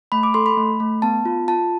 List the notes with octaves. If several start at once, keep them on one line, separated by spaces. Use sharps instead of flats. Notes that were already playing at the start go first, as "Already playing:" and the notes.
A3 B5
D6
A4 C6
B5
A3
A3
B3 A5
F4
F4 A5